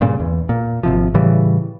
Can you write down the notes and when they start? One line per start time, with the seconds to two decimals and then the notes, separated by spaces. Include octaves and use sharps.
0.01 G2 A#2 C#3
0.20 E2
0.49 A#2
0.83 G#1 C3 F3
1.14 A2 C#3 E3 G3